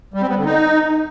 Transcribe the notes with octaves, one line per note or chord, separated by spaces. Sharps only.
G3
C4
B3
D3
D#4